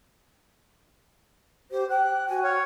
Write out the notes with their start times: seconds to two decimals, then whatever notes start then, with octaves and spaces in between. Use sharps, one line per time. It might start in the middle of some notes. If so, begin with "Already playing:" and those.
1.71 G4 C5
1.89 G5 F#6
2.29 F#4 G#5
2.44 C#5 F6